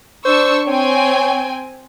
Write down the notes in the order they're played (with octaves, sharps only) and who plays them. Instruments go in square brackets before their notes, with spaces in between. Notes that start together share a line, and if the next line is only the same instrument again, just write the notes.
[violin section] D4 C#6 E6 [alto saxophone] C5
[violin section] C4 G5 G#5 [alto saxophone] C#5